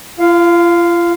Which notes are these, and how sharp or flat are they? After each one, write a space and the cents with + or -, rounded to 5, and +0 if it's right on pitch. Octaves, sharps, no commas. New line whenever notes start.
F4 -40 F5 +0